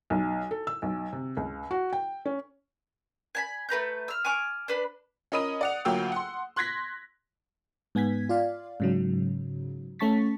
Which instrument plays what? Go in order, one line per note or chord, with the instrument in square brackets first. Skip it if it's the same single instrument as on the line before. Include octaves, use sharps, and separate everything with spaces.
[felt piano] B1
A4
E6
B1
C3
C#2
F#4
G5
C#4
[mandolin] G#5 A5 B5
A3 B4 A#5 G6
E6 F6
G#5 C#6 D6 F6
D4 B4 B5
[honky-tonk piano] C#4 A#4 D#5 B5 D#6 D#7
D5 F#5 F7
D2 F#3 A#3 F4 G5 E6
F#5 C6
C6 F#6 G#6 A#6 B6
[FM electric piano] G#2 B3 G#5 G#6 B6
F4 D5 F5
G#2 C#3 F#3
A3 C#4 A5 C#6 A6 B6